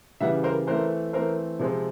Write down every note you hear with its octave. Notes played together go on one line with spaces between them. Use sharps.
C#3 E3 G3 E5 F#5
A#4 C5
E3 A3 C4 A#4 C5
E3 A3 C4 A#4 C5
C3 F3 G#3 C4